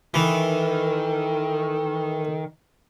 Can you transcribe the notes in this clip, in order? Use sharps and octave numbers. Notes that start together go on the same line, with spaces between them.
D#3 E3 A4